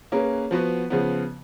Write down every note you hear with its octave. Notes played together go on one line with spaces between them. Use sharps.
A#3 C#4 G#4 B4
F3 B3 F#4 B4
C#3 F3 B3